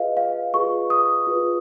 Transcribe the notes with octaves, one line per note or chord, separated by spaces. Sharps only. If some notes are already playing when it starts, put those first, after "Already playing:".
Already playing: F4 G#4 B4 D#5 F5
F5
F4 G#4 B4 C#6
D#6
F4 G#4 B4